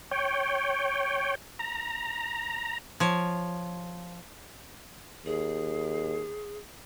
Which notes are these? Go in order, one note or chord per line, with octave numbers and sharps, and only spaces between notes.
C#5 G5
A#5
F3 C#5
D#2 G#4